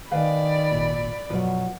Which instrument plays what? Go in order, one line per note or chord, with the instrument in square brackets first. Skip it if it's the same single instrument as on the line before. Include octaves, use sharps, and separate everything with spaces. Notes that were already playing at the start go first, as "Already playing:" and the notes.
[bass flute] D#3 [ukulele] B4 F5 G#5 [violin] D5 B5
[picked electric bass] G#1 A#2
[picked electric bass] F#2 B2 F3 [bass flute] F#3 [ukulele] B4 F#5